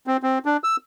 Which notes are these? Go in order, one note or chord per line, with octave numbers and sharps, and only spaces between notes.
C4
C4
D4
E6